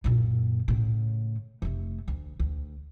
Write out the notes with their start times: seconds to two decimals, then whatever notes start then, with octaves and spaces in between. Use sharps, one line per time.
0.04 F#2 A#2
0.68 A2 C#3
1.62 F1 A3
2.08 D2
2.40 D2